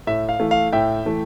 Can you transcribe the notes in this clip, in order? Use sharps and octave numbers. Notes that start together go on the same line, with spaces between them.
A2 E5
F5
E3 A3
F5
A2 E5 G5
E3 A3